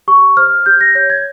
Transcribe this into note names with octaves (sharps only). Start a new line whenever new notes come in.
G4 C#6
C5 F6
G4 G6
A#6
C#5 G6
G#6